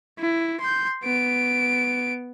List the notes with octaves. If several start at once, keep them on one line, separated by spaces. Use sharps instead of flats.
E4
C6 G6
B3 D7